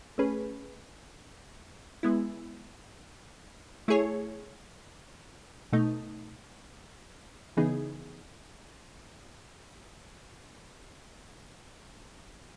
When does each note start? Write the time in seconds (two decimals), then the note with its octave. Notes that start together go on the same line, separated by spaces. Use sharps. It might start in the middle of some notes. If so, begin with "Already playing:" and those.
0.18 A3 C#4 G#4 B4
2.03 G#3 B3 E4
3.88 A3 E4 G#4 C#5
5.72 B2 A3 D#4
7.57 C#3 E3 B3 D#4 G#4